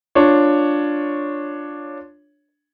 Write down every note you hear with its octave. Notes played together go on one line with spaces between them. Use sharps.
D4 F4 C#5